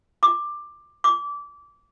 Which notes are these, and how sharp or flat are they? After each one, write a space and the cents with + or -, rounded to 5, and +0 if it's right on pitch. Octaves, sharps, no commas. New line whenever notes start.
D6 +10
D6 -20